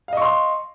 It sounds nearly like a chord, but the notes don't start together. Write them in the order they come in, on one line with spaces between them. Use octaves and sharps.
F5 D#5 C#6 C6